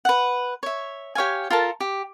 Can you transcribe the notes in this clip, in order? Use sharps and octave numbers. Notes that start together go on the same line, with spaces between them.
B4 F#5
C#5 E5
G4 C#5 F5 G#5
F4 A4 A#4 A5
G4